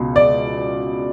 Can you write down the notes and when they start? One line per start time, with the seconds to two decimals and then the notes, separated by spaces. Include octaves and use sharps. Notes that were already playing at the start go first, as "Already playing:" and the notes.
Already playing: C#2 B2
0.16 D5